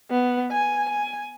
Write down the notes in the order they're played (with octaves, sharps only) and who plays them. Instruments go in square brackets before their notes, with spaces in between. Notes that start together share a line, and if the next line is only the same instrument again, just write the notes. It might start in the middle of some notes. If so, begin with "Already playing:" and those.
[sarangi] B3
G#5
G#5